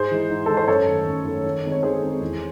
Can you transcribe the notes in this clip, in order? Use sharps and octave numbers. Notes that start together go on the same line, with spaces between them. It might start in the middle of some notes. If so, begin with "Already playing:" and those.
Already playing: G#2 G#4 C5
E3 G#3 D#4
G#2
E3 G#3 D#4 A4
C5
F#2 A4 C#5
D#3 A3
F#2
D#3 A3
D#3
G#3 C4 D#4
C#5
D#3 G#4 C5
G#3 C4 D#4
E2